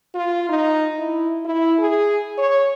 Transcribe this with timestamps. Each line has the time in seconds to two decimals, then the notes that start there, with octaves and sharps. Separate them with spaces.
0.15 F4
0.49 D#4
0.99 E4
1.45 E4
1.79 G#4
2.38 C#5